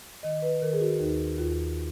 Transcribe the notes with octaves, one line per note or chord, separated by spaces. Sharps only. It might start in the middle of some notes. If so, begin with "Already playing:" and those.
D#3 D#5
B4
D#3 A#4
G#4
F#4
D#2 D#4
D#2 F4